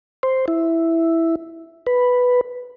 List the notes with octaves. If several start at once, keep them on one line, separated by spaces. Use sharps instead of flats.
C5
E4
B4